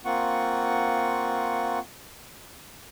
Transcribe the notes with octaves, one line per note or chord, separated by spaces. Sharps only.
A#3 C4 F4 F#5 C#6